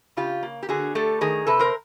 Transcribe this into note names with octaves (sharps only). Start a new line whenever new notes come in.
C#3 F4 G4
A#3
G4
D3 F#4 G#4
A3 G4 A4
D#3 G#4 A#4
C3 A4 B4
A#4 C5